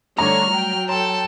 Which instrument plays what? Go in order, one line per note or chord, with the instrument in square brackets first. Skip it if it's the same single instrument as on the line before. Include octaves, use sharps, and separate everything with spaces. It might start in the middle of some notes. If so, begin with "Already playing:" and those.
[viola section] D3 C#5 [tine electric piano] G3 A3 [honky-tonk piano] A#5 [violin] F6
[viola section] F#3 G5
[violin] A4 A5 [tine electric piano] C#5 A#5 C6